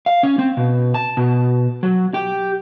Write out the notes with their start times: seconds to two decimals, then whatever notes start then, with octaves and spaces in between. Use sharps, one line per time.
0.06 F5
0.23 C#4
0.39 C4
0.57 B2
0.94 A5
1.17 B2
1.83 F#3
2.14 G4